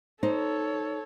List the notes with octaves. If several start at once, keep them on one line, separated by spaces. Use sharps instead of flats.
D#4 A4 C5 C#5